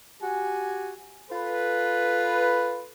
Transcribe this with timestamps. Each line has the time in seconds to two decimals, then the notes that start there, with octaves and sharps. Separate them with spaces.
0.22 F#4 G4 G#5
1.31 F4 A4 B4